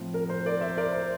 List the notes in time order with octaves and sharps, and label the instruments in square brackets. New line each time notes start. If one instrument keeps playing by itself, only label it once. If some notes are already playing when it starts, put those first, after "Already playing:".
Already playing: [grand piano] A2 F3 C4
A#4
C5
A#4 D5
C5 E5
A#4 D5
C5